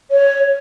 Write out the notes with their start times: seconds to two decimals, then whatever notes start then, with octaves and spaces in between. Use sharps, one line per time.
0.11 C#5